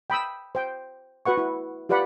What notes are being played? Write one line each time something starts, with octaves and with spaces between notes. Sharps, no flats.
G5 B5 D#6 E6
C5 G5
F#4 B4 F#5 C#6
E4
F4 G4 B4 D5 F#5 B5